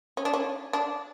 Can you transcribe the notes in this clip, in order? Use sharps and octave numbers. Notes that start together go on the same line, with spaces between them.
C#4
D4
C#4
D4